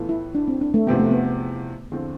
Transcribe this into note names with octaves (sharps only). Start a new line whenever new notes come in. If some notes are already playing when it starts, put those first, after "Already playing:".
Already playing: A2 E3 B3 F4 A4
E4
D4
C4
D4
A3
E2 C3 F3 B3 C4 G4
A3
B3
E2 D3 F3 C4 F4